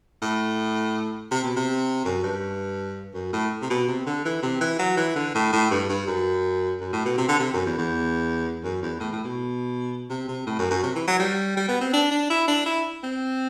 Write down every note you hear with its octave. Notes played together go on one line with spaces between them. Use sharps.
A2
C3
B2
C3
F#2
G2
F#2
A2
C3
B2
C3
D3
E3
C3
E3
F#3
E3
D3
A2
A2
G2
G2
F#2
F#2
A2
B2
C3
D3
C3
F#2
E2
E2
F#2
E2
A2
A2
B2
C3
C3
A2
F#2
F#2
C3
E3
F#3
G3
G3
B3
C4
D4
D4
E4
D4
E4
C4